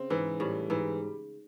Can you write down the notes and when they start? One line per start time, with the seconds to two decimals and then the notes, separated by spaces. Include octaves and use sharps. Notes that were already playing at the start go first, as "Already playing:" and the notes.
Already playing: C#3 C4
0.10 G#2 E3
0.40 A2 G3
0.70 G#2 E3